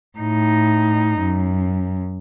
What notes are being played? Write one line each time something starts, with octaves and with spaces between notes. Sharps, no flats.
A2 D#4
F#2